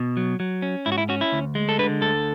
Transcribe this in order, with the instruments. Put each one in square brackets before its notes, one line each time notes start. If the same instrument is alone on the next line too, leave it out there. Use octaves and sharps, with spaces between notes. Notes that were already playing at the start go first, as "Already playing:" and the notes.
Already playing: [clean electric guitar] B2
F#3
F#3
C#4
G#2 E4
F#4
E4
C#4 F#4
E4
D2
G#3
A4
D3 B4
D2 A4